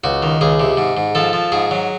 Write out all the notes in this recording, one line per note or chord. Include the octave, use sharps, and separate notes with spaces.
C#2 F#4
D#3
C#2 G#4
C3
G#2
G#2
F3 A4
F3
G#2 G#4
F#3